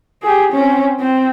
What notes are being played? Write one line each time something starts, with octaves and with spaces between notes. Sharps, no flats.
G4 G#4
C4 C#4
C4